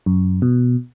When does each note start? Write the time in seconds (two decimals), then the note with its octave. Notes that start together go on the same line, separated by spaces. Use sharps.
0.06 F#2
0.42 B2